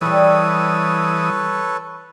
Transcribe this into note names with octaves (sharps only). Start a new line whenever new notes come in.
E3 G3 G#4 A4 B4 C#5 D#6